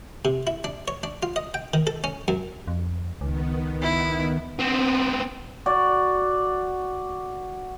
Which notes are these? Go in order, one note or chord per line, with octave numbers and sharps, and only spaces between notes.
C3
E4
D4
C#5
D4
F4
D#5
G5
D#3
A4
C#4
F#2
F2
C#2 D#3 B3
E4
B3 C4
F#4 D5